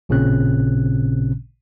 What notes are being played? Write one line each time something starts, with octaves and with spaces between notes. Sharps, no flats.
A1 A#2 C#3 C4 C#4 F#6